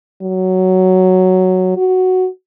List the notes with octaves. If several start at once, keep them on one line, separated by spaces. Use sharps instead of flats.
F#3
F#4